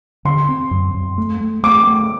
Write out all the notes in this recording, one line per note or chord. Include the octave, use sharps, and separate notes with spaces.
D3 C6
C4
F#2
F#2
A3
A3
A3 D6
A3